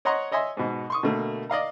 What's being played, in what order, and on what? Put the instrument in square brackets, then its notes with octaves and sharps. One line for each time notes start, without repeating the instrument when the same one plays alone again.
[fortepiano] C#5 D#5 F#5 A#5 C6 C#6
C#5 D#5 E5 G#5 C6
G#2 B2
C6 C#6 D#6
B2 D3 A3 A#3
D5 D#5 F5 A#5